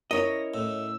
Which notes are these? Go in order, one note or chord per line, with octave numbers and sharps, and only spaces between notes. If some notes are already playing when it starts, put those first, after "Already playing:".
C#4 E4 A#4 C#5 D#5 A#6
A2 E6